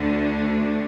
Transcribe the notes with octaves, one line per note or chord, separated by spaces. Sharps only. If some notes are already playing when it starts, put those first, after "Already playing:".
Already playing: D2 D3 A3 D4